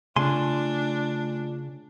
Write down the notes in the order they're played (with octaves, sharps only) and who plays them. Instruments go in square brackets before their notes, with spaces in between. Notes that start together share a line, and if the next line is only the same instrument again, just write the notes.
[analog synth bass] C#3 [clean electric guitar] A3 G#5 C6 [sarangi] D4 [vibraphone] F4